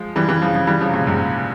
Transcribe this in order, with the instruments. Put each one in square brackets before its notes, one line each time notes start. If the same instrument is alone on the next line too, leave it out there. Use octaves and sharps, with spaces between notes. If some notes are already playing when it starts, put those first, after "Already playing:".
Already playing: [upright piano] F3 G#3
E3 G3
E3 G3
C#3 F3
C#3 F3
E3 G3
C#3 F3
C3
A#2 C#3
G#2 C3